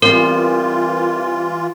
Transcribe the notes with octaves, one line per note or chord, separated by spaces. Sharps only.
E3 G3 C4 F4 A#4 C5